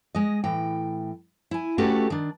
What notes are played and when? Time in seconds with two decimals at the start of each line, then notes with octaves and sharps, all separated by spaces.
0.15 G#3 D#5
0.44 A2 E3 G5
1.51 E4 G#5
1.78 A3 C#4 F#4 G4 A4 B4
2.10 D#3 D4